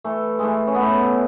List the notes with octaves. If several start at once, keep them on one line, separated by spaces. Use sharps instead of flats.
E3 A3
E3 G#3 A3
C#4
B3
A2 A3